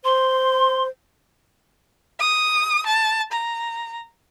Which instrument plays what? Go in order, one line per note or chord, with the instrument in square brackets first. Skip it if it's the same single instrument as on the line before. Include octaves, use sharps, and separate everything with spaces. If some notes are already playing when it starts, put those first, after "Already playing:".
[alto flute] C5 [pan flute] C6
[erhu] D#6
A5
A#5